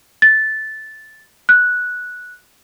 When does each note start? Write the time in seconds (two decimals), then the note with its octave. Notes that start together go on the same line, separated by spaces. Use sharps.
0.22 A6
1.49 F#6